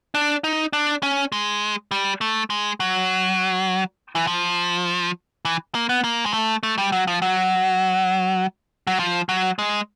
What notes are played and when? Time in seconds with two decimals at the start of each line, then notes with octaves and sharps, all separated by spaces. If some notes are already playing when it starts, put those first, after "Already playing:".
0.15 D4
0.44 D#4
0.73 D4
1.03 C#4
1.32 G#3
1.91 G3
2.21 A3
2.50 G#3
2.80 F#3
4.16 E3
4.27 F3
5.45 E3
5.75 A#3
5.89 B3
6.04 A#3
6.26 G#3
6.33 A3
6.63 A3
6.78 G3
6.92 F#3
7.07 F3
7.22 F#3
8.87 F#3
8.99 F3
9.29 F#3
9.59 G#3